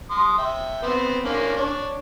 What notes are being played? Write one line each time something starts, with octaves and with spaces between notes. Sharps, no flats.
C6 D#6
E5 G5
B3 C4 C5
A#3 C#4 D4
D4 C#5